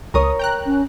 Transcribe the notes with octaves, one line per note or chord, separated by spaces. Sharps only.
C#2 A#4 C#5 D#6
G5 A#5 F#6
C#4